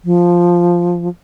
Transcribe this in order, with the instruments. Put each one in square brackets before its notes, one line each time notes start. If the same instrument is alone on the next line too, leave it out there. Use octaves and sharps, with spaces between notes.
[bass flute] F3